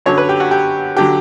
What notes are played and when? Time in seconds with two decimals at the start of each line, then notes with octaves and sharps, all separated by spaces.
0.06 F#2 D3 F#3 C#5
0.18 B4
0.29 G4
0.40 F#4
0.51 G4
0.96 D3 F#3 G4